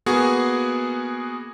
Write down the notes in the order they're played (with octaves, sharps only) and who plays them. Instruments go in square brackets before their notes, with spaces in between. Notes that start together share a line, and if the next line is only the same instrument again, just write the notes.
[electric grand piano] A#3 B3 F#4 G#4